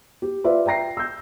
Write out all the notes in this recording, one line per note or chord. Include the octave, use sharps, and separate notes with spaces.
G4
F4 B4 D5 E5
E5 G5 A#5 A#6 C7
E6 G6